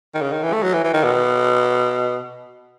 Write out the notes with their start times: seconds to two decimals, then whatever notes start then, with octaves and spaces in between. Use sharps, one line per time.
0.14 D#3
0.22 C#3
0.32 D#3
0.43 E3
0.53 A3
0.63 F#3
0.73 E3
0.84 E3
0.94 D#3
1.04 B2